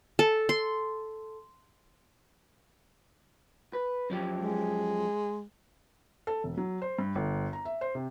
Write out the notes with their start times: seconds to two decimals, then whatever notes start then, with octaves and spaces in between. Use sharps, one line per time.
0.19 A4
0.49 C6
3.73 B4
4.10 F#2 F3 G4
4.36 G#3
6.27 A4
6.44 E1
6.57 F#3
6.82 C5
6.99 G2
7.15 G1
7.53 A#5
7.65 E5
7.81 C5
7.95 C3